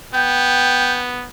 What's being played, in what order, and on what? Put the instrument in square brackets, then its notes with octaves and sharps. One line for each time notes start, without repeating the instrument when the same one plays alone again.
[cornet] B3 [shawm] G5